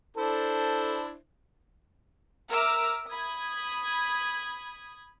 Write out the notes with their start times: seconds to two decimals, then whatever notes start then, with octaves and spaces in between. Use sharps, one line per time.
0.17 D4 E4 A4 C5
2.50 A#4 E5 A#5 D6 E6 F6
3.09 B5 D#6 G#6